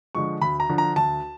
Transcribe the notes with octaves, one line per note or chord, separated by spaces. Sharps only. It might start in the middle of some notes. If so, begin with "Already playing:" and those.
D3 F3 G#3 C#6
D2 B5
A#5
D3 F3
A#5
D2 A5